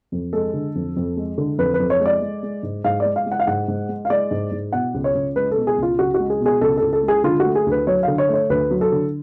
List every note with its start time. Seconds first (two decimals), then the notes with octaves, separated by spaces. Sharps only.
0.12 F2
0.33 G#3 A4
0.54 D3
0.75 F2
0.96 F2
1.17 G#3
1.38 D3
1.58 F2 B4
1.74 B4
1.80 F2
1.90 C#5
2.00 G#3
2.06 D5
2.22 G#3
2.43 G#3
2.63 G#2
2.84 G#2 F5
3.00 D5
3.05 G#3
3.16 F5
3.26 G#3
3.32 F#5
3.39 F5
3.47 G#2 F#5
3.68 G#2
3.89 G#3
4.05 F5
4.10 G#3 D5
4.31 G#2
4.52 G#2
4.73 B2 F#5
4.94 C#2
5.04 C#5
5.15 C#2
5.36 G#3 B4
5.51 A4
5.57 B2
5.67 G#4
5.78 C#2 F4
5.99 C#2 F#4
6.14 F#4
6.19 G#3
6.30 G#4
6.40 B2
6.46 G#4
6.61 C#2 A4
6.77 C#2 A4
6.93 A4
7.03 G#3
7.08 G#4
7.24 D3 F4
7.40 F#4
7.45 A3
7.55 G#4
7.66 D2 B4
7.87 F#3 C#5
8.03 D3 F5
8.18 C#5
8.29 A3
8.34 C#5
8.50 D2 B4
8.71 F#3
8.81 A4
8.92 D3